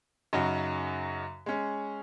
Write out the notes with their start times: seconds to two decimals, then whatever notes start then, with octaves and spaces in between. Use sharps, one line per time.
0.33 F#2 C#3 F#3 D#4 F#4
1.46 G#3 C#4